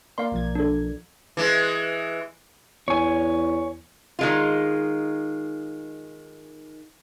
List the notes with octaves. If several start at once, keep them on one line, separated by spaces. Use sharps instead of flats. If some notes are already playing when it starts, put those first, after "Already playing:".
A#3 A#4 D5 F5 C6
B1 F3 G#6
D4 A4
E3 G#3
E2 C#5 G#5
D#3 G#3 F4